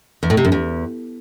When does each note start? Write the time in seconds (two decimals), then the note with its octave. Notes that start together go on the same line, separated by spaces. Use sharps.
0.23 E2
0.30 A2
0.37 C3
0.45 F#2
0.52 E2